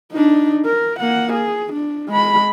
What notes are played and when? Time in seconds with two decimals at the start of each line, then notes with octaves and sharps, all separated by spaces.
0.12 D4 D#4
0.65 A#4
1.00 A#3 F#5
1.33 G#4
1.73 D4
2.08 G#3 B5